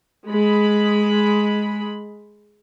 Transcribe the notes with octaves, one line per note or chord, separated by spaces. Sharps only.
G#3 B5